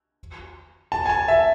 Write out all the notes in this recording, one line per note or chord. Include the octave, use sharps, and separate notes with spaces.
A5
G#5
A5
E5